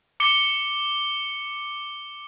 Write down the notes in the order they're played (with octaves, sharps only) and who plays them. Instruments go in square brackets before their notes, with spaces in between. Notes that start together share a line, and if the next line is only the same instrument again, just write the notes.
[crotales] D6 C#7 G7